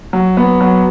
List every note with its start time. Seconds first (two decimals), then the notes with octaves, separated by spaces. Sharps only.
0.13 F#3
0.37 B3
0.61 F#3